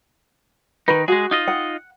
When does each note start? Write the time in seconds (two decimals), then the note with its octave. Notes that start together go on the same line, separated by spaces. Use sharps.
0.88 D#3 D#4 B4
1.08 G#3 F#4 G#4
1.31 D#4 F4 D#5
1.48 F#5